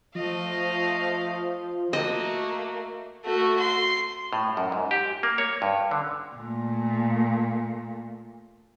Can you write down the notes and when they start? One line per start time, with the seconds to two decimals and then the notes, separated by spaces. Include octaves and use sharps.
0.15 F3 A3 D#5 F5
1.93 A3 A#3 F#4 D#5
3.25 A3 F#4
3.59 C6
4.33 A2
4.57 F#2
4.72 G#2
4.91 G4
5.23 A#3
5.38 C#5
5.62 G2
5.91 D3
6.35 A#2 A3